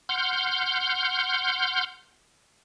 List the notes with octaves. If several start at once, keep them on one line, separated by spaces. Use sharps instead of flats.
F#5 C6 F6 G6